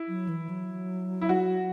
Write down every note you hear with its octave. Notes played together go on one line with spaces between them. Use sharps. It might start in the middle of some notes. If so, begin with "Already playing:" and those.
Already playing: E4
F#3
E3
F#3
E4
F#4